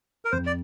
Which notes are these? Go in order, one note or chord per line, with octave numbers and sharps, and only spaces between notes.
A#4
F2 C5
D5